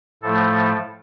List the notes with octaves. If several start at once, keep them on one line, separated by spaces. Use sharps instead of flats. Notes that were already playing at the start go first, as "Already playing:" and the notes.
A2 F3 A3 A4